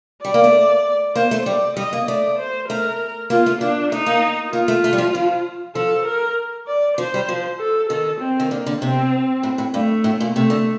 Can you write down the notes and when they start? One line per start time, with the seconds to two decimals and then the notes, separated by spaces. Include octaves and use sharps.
0.24 G3 D5
0.34 A#3
0.44 A3
1.15 A#3 C5
1.31 A3
1.46 G3 D5
1.77 G3 D#5
1.93 A#3
2.07 A3 D5
2.39 C5
2.69 A3 A#4
3.30 A#3 F4
3.46 A3
3.61 A#3 D4
3.92 A3 D#4
4.06 A#3
4.53 A#3 F4
4.68 A3
4.84 A3
4.93 G3
4.98 F3
5.15 F3
5.75 F3 A4
6.06 A#4
6.67 D5
6.98 F3 C5
7.14 G3
7.29 F3
7.60 A4
7.89 D#3 A4
8.21 C4
8.40 D#3
8.51 D3 A#3
8.66 D3
8.81 C3 C4
9.43 A2
9.58 A2
9.74 G2 A3
10.04 A2
10.20 A#2
10.35 C3 A3
10.50 D3